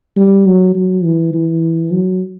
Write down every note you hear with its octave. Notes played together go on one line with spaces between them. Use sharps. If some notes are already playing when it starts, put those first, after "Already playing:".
G3
F#3
F#3
E3
E3
F#3